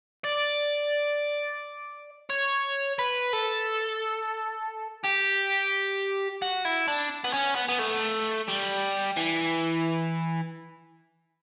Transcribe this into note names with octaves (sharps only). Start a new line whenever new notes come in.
D5
C#5
B4
A4
G4
F#4
E4
D4
B3
C#4
B3
B3
A3
G3
E3